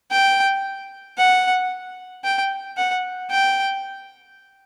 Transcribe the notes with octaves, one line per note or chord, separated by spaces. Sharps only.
G5
F#5
G5
F#5
G5